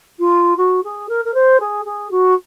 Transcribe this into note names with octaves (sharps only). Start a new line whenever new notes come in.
F4
F#4
G#4
A#4
A#4
C5
G#4
G#4
F#4